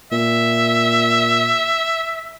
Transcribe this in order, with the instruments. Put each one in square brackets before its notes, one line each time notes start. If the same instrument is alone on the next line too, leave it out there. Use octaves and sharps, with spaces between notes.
[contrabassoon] A#2 [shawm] E5